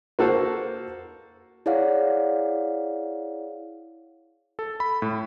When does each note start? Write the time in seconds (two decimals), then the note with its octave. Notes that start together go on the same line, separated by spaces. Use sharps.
0.19 A#3 F#4 A4 C5
1.66 E4 G#4 C#5 D5 F5 F#5
4.59 A4
4.80 B5
5.02 A2